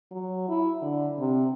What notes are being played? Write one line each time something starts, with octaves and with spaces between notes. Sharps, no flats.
F#3
E4
D3
C3